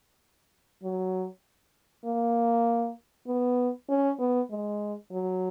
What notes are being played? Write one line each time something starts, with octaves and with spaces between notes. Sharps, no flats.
F#3
A#3
B3
C#4
B3
G#3
F#3